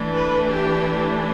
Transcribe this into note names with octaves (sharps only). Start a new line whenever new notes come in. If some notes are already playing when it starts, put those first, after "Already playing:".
Already playing: E3 A3 D4
B4
G4